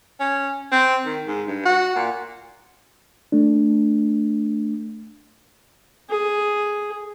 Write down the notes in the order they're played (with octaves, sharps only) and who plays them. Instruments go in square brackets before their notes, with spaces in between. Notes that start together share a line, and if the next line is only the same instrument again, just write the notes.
[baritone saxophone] C#4
C4
D#3
G#2
G2
F#4
A#2
[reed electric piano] A3 D4
[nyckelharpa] G#4